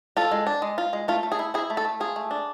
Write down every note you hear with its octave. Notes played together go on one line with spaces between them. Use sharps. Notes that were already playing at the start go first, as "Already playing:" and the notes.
F4 A4
G#3
D4
G#3
F4
G#3
A3 F4
A3
G#4
E4
E4 G#4
A3
A4
A3
F4 G#4
A3
D4